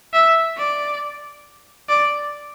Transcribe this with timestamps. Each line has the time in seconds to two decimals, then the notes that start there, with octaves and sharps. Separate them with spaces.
0.13 E5
0.57 D5
1.89 D5